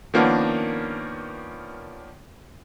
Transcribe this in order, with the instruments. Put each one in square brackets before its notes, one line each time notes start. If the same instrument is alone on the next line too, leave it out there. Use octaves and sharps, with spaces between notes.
[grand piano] D#3 F3 A#3 B3 C#4 D4